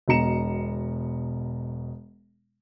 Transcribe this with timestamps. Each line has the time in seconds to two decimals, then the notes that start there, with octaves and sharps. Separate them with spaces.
0.08 E1 B2 D#5 A#5 C#7 E7